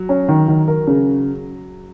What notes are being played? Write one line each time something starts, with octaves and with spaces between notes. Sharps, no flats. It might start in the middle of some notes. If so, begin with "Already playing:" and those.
Already playing: F#3
C#4
D#3
D#3
A#4
C#3